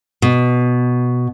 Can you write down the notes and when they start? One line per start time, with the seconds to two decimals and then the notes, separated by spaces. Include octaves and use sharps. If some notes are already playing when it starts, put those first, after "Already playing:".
0.22 B2